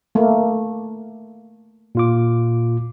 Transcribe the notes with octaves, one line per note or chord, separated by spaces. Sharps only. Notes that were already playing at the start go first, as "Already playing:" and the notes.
A3 A#3
A#2 F4 D6